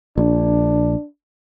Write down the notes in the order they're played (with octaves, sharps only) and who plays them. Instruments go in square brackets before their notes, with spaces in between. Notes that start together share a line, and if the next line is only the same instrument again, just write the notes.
[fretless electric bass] A#1 [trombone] D4